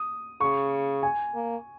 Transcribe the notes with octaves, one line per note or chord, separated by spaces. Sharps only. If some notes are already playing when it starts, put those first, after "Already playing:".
Already playing: D#6
C#3 C#6
G#5
A#3